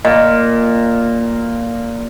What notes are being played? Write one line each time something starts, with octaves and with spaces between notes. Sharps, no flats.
A#2 D#5